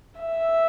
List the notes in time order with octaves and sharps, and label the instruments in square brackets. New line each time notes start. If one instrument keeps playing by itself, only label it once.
[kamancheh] E5